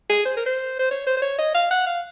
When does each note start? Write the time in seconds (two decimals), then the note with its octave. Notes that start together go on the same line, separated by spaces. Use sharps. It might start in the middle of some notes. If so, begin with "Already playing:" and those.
0.10 G#4
0.25 C5
0.37 A#4
0.46 C5
0.79 C5
0.91 C#5
1.07 C5
1.17 C5
1.22 C#5
1.39 D#5
1.55 F5
1.71 F#5
1.86 F5